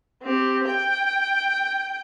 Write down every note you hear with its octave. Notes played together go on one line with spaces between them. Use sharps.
C4 G4
G5